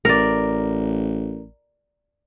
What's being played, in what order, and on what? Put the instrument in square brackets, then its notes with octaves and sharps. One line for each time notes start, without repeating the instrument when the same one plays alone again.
[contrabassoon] A1 [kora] A#4 D5